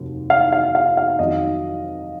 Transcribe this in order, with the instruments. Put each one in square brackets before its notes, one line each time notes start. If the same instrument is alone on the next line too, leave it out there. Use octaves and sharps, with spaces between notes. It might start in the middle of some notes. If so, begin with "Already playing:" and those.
Already playing: [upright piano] F1 D#2 F#3
F5
F5
F5
F5
F2 D#3 F#3 D#5